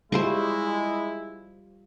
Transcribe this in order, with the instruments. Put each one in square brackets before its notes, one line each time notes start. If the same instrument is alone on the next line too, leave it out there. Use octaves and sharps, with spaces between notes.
[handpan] G3 F4 [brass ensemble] G#3 E4 [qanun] C5 C6 C#6